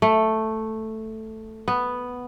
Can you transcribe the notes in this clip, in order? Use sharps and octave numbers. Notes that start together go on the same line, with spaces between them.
A3
B3